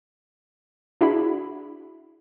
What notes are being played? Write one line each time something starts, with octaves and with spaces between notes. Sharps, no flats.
D4 E4 F#4 G#4 B5